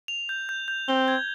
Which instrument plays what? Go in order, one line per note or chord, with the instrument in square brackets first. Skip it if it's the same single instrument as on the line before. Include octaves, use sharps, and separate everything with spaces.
[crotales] F7
G6
G6
G6
[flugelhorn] C4 [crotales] G7
[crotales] G#6